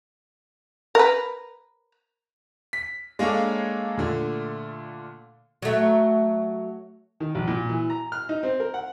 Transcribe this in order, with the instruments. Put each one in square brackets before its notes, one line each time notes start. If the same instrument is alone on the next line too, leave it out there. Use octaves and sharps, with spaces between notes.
[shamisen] A#4 B4
[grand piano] B6
G#3 A#3 D4 A4 C#5 F5
A#2 D3 A3
[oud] F#3 A3
[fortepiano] D#3
A#1
A#2
E3
A#5
F6
D#4
C4
A#4
F#5